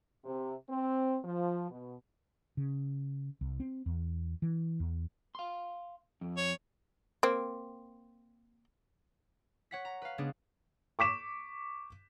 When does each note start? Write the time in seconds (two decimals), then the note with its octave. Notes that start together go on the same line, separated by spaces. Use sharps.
0.25 C3
0.70 C4
1.25 F3
1.71 B2
2.57 C#3
3.41 C2
3.60 C4
3.86 E2
4.42 E3
4.80 E2
5.35 F5 C6
6.21 F2
6.37 C#5
7.23 A#3 C4
9.71 C#5 F#5 B6
9.85 A#5
10.02 B4 F5
10.18 C#3 G#3 B3 C#4 D4
10.99 C#6 D6 B6 E7